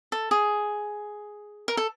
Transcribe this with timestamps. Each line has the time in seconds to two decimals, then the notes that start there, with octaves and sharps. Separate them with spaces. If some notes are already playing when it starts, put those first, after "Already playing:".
0.12 A4
0.31 G#4
1.68 A#4
1.77 A4